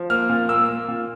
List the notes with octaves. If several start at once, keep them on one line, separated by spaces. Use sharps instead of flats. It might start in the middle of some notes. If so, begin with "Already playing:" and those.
Already playing: F3
A#3 F6
A#2
A#3 E6
A#3
A#2